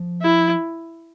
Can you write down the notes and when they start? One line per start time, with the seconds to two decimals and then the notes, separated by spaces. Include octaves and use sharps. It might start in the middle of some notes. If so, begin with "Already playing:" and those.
Already playing: F3
0.22 E4